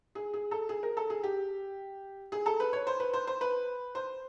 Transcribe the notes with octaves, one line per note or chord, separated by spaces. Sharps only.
G#4
G#4
A4
G#4
A#4
A4
G#4
G4
G#4
A4
B4
C#5
C5
B4
C5
C5
B4
C5